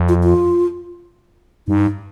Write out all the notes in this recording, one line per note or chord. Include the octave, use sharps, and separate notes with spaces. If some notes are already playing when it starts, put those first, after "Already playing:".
Already playing: F2
F4
F4
G2 D#4